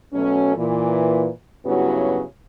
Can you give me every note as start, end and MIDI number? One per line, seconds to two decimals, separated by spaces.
0.13 0.57 47
0.13 0.57 54
0.13 0.57 57
0.13 0.57 61
0.57 1.28 46
0.57 1.28 52
1.66 2.21 43
1.66 2.21 49
1.66 2.21 54
1.66 2.21 59
1.66 2.21 64
1.66 2.21 66